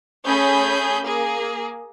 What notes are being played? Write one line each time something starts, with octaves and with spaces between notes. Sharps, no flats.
A3 C#4 G#4 B5 G6
A#3 G#4